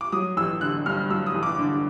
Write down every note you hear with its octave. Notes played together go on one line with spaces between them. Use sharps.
D6
F#3 D#6
A1 E6
D3 F#6
G2 F6
F#3 E6
D#6
A1
D6
D3